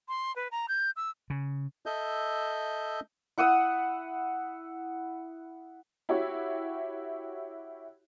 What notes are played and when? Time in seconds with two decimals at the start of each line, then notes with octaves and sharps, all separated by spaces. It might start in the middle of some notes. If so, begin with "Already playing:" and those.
0.09 C6
0.36 B4
0.52 A#5
0.68 G6
0.96 E6
1.30 C#3
1.86 A4 D#5 E5 G6
3.38 E4 F#5 D#6 E6
6.09 E4 F#4 G4 C#5 E5